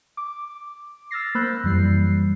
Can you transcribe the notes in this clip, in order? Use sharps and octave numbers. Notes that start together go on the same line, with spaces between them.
D6
E6 F6 A6 A#6 C7
A#3 C5 B5 E6 F#6 G6
F#2 E3 G3 C7